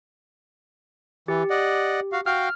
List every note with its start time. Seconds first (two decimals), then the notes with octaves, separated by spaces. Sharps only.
1.28 E3 G4
1.50 D5 D#5 F#5
2.12 F#4 F5
2.26 F#4 F5 G5 F6